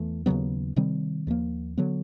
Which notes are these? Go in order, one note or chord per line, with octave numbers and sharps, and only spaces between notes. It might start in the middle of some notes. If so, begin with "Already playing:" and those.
Already playing: E2 E3 A3
D#2 C#3 F#3 B3
C3 D#3 G3 C4
D#2 D3 F3 A#3
D3 F#3 B3